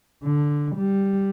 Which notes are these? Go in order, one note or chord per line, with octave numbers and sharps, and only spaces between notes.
D3
G3